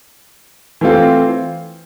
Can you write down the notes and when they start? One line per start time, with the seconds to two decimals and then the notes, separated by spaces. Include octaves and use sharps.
0.81 E3 A3 C4 F4